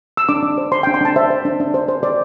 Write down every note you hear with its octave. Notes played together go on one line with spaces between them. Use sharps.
E6
D4 D6
D4
C5
C5 C6
D4 G5
C6
D4 A5
C5 E5
C5
D4
D4
C5
C5
C5 D5